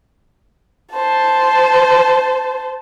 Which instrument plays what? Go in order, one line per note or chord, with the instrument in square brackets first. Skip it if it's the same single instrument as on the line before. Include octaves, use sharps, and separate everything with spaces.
[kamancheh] C5 A5